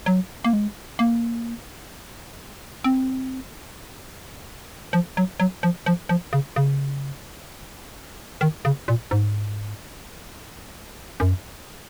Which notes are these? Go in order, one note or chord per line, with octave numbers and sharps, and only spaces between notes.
F#3
A#3
G#3
A#3
C4
F3
F#3
F#3
F3
F3
F3
C#3
C#3
D#3
C#3
A#2
G#2
F#2